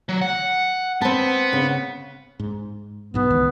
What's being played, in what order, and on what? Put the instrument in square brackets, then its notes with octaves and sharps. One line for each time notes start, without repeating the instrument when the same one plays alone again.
[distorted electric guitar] F#3
F#5
[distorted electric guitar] B3 [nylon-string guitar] C4 A5
[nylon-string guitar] C#3
[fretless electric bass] G#2
[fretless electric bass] B1 G#2 B2 [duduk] B3
[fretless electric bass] C#2 D#3 E3